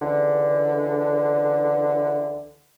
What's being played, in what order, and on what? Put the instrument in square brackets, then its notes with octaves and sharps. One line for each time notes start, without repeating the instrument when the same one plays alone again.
[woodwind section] C#2 D3 E3